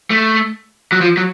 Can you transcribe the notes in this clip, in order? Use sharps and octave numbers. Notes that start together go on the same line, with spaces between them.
A3
F#3
F3
F#3